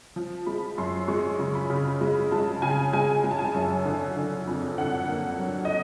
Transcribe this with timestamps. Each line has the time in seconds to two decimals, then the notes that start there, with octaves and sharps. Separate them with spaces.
0.16 F3
0.46 G#3 B5
0.78 F#2 C6
1.08 G#3 C#6
1.40 C#3
1.55 B5
1.70 C#3
2.01 G#3 B5
2.31 G#3 A5
2.62 C#3 G#5
2.93 G#3 G#5
3.24 G#3
3.31 A5
3.39 G#5
3.54 F#2
3.85 D3
4.17 D3
4.47 F2
4.78 D3 F#5
5.08 A#3
5.39 F#3
5.65 D#5